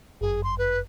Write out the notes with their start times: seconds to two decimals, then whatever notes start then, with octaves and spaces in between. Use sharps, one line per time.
0.21 G1 F#2 G#4
0.44 C6
0.58 B4